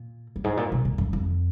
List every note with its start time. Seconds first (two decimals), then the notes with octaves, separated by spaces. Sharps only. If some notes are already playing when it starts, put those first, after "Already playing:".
Already playing: A#2
0.36 F#2
0.44 G#2
0.57 A#2
0.72 B2
0.85 A#2
0.98 F#2
1.13 F2